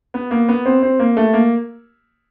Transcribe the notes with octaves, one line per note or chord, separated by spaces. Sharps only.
B3
A#3
B3
C4
C4
A#3
A3
A#3